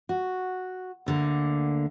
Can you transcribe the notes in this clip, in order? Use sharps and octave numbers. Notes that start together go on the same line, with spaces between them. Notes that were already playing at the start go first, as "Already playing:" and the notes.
F#4
D2 D3 A#3